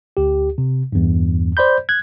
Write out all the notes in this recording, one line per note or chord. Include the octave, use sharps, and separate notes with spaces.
D2 G4
C3
E2 G2
C5 D5 B5 G6
F#6 G#6